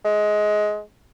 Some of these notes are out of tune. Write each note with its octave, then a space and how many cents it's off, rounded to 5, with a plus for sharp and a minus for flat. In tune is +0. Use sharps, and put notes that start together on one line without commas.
G#3 +20